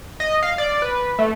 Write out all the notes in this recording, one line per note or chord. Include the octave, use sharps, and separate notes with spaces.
D#5
F5
D5
B4
A3